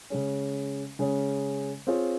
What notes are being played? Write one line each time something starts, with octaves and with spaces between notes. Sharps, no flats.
C#3 G#3 C#4
C#3 G#3 C#4
C4 F4 G#4 C#5